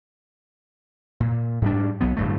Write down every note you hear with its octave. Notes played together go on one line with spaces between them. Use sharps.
A#2
G#2 G3 D4
B1 F#3 B3
D1 G2 A3